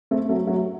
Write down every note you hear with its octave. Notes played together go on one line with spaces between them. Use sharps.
A3 C4
F#3 A3
F#3 A3